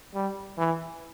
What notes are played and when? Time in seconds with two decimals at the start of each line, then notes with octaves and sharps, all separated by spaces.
0.14 G3
0.58 E3